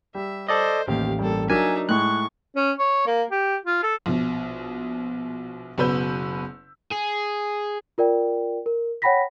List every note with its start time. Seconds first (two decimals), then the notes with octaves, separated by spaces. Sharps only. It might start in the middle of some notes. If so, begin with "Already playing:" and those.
0.15 G3 E5
0.48 A4 C5 D5 D#5
0.88 A1 D#2 G4 F5
1.19 G2 A#3 A4
1.50 F#3 D4 D#4 A#4 E5 G#5
1.89 A2 G#3 C#6 F#6
2.56 C#4
2.79 C#5
3.06 A#3
3.31 G4
3.65 F4
3.83 A4
4.06 A#1 B2
5.78 F#1 B2 F#4 B4 E6 G6
6.91 G#4
7.98 F4 A#4 D5 G5
8.66 A#4
9.02 C#5 F#5 G5 B5 A#6 B6